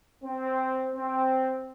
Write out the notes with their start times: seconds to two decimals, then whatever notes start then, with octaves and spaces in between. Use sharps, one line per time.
0.23 C4
0.94 C4